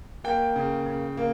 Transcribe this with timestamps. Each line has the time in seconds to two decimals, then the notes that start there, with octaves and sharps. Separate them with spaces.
0.24 A#3 G5
0.56 C#3
0.86 C#3
1.17 A#3